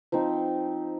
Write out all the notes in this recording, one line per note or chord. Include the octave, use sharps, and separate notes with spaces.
F3 C4 D#4